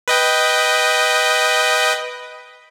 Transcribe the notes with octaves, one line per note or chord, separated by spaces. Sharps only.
B4 D#5 G5